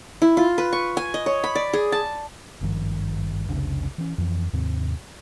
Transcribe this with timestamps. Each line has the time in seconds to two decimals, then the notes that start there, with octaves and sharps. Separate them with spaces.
0.22 E4
0.37 F4
0.58 B4
0.73 C#6
0.97 G#5
1.14 D#5
1.26 C#5
1.44 B5
1.55 D5
1.73 G#4
1.92 A5
2.61 G#1 G2 D#3 F3
3.49 F1 C2 C#3 D4
3.98 E3 C#4
4.18 F2 E3
4.53 D#2 G#2 C3 C4